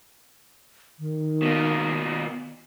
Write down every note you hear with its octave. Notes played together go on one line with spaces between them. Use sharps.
D#3
B2 A#3